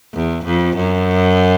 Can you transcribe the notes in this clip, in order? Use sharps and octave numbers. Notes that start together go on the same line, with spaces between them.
E2
F2
F#2